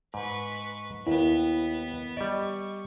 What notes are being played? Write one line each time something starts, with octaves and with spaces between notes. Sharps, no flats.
G#2 B4 C#6
D#2 B3 E4
G3 D5 D#5 C#6